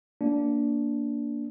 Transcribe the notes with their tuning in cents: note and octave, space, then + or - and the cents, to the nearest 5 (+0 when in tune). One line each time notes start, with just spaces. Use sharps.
A#3 +0 D4 -15